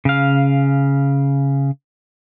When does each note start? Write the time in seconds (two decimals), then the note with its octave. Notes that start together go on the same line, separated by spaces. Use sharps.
0.05 C#3 F5